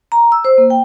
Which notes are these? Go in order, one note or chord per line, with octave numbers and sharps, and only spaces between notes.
A#5
E6
C5
A#3
G5